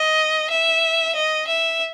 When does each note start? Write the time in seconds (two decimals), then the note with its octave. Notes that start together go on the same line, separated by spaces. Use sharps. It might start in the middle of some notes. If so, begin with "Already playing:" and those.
Already playing: D#5
0.51 E5
1.16 D#5
1.48 E5